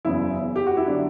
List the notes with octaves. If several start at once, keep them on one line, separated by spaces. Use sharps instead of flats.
F#1 E2 C#3 E4
G4
F#4
E4
D3 F#3 D4